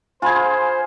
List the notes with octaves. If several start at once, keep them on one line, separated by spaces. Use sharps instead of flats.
F4 G#4 C5 G#5 B5 G#6